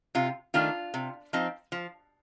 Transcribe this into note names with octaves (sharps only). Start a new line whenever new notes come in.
C3 F4
D#3 A3 D4 F4
C3
F3 C4 D#4
F3